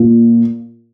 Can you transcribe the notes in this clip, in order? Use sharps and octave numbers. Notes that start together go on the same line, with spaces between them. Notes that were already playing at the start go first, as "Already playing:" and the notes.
Already playing: A#2